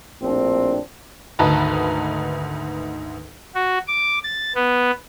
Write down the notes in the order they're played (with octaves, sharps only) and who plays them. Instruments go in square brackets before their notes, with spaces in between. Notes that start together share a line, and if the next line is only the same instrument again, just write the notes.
[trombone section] A#1 A2 C4 D4
[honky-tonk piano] G#1 D2 D#4 B4 A5 A#5
[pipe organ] F#4
D6
A6
B3